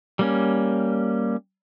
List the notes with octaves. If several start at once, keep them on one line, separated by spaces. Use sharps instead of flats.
G3 A#3 C#4